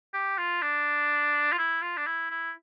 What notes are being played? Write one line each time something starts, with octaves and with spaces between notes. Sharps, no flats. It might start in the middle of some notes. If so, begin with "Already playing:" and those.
G4
F4
D4
F4
E4
F4
D4
E4
E4